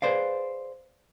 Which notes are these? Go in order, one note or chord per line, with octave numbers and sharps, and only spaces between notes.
G#4 B4 C5 D5 F5